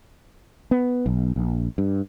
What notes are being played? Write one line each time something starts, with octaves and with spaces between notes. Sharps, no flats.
B3
B1
A#1
G2